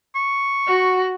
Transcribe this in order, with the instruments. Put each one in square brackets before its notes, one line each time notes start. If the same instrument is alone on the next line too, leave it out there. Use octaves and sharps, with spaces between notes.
[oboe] C#6
[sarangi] F#4